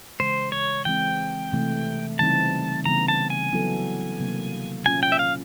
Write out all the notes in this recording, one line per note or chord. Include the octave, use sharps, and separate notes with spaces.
C#3 E3 G#3 C5
C#5
E3 G#3 C4 G5
C3 E3 A3
C#3 E3 G3 C4 D#4 A5
C#3 E3 G3 B3 A#5
A5
G#5
F#3 B3 E4 A4
C3 D#3 F#3 A#3 D4
A#2 F#3 A#3 C#4 F4 G#5
G5
E5
F5